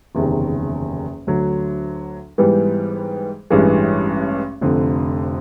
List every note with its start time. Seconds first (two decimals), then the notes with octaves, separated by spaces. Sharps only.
0.15 F#1 E2 C3 D#3
1.27 D2 D3 F#3
2.38 G#2 E3 G3 B3
3.50 A1 G2 E3 G#3
4.61 F1 F2 D3